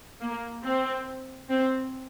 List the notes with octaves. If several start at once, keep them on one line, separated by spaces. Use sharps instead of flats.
A#3
C4
C4